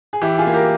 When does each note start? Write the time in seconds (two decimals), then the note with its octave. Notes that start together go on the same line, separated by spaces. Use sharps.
0.13 G#4
0.22 E3 E4 G4
0.38 F4 G#4
0.46 A#3
0.53 G4 A#4